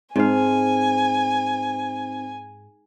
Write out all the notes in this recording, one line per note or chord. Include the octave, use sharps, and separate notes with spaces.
G#2 C4 D#4 C5 F5 G#5